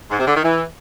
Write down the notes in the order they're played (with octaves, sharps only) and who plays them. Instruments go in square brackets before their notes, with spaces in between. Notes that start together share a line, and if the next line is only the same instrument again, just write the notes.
[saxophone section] G#2
C3
D3
D#3
E3